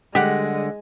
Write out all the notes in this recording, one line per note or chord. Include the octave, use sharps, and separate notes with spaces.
D3 G3 G#3 G4 F#5